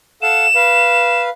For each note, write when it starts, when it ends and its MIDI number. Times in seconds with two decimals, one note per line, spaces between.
0.22 0.46 69
0.22 0.46 77
0.22 0.46 78
0.22 1.22 100
0.55 1.29 71
0.55 1.29 77